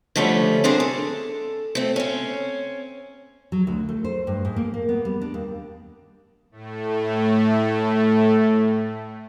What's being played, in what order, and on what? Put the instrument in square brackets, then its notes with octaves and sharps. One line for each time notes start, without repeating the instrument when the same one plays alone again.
[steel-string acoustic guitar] D3 F3 G3 A3 C#4
C4 D4 G#4 A#4 C5
A4
A3 C4
C4 C#4
[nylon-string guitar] F#3
D2
A3
C5
G2
G#2
A#3
A#3
B3
G3
D4
D#2
[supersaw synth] A2 A3